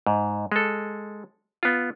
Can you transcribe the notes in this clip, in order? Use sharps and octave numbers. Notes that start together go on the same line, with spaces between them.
G#2
G#3 A4
B3 F4